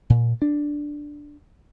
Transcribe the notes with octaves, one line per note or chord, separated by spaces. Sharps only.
A#2
D4